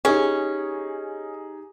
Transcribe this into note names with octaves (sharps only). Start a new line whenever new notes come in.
C#4 D#4 G4 G#4